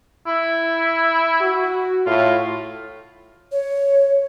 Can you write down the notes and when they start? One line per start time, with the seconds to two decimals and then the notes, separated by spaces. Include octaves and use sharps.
0.27 E4
1.41 F#4
2.06 A2 F4
3.52 C#5